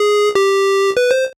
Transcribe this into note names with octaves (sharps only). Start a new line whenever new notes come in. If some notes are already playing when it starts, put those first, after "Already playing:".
Already playing: G#4
G4
B4
C5